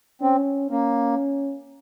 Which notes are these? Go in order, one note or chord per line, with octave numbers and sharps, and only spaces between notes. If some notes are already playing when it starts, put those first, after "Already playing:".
C4 C#4
A#3 C#4